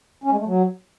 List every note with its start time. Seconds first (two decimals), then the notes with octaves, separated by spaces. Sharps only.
0.24 C#4
0.31 G#3
0.39 A3
0.46 F#3